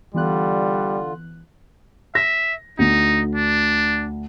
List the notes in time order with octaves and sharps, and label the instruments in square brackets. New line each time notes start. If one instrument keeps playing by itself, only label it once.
[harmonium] D3 F4 [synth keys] E3 B3 F#6 [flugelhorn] G3
[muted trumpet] E5 [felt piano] A#6
[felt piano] D2 [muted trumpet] D#4
[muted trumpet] D4